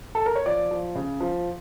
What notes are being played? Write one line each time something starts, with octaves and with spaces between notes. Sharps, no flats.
A4
A#4
C#5
F3 D5
F3
C#3
F3